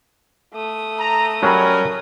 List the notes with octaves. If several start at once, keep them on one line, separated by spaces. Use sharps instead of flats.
A3 D#6
A#5
F#3 G3 C#4 A#4 B5